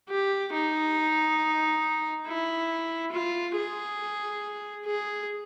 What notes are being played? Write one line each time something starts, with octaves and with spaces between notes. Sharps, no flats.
G4
D#4
E4
F4
G#4
G#4